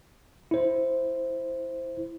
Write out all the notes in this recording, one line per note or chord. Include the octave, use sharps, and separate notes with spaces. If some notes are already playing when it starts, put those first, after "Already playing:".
E4 C5